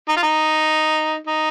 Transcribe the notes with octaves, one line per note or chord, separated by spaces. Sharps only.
D#4
F4
D#4
D#4